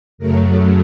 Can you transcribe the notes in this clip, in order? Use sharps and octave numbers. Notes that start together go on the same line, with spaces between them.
F#2 C#3 F#3 A3 A#4